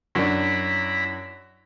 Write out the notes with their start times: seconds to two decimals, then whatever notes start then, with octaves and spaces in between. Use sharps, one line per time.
0.15 F#2 D4 E4 A#5 B5